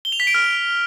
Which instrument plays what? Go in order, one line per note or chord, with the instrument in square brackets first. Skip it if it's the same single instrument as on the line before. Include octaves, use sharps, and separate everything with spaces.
[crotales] G7
F7
B6
D7
F6